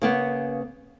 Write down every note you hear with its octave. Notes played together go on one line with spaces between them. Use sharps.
C#3 A#3 B3